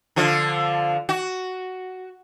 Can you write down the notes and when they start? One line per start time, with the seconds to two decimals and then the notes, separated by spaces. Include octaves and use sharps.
0.16 D3 F3 F4
1.09 F#4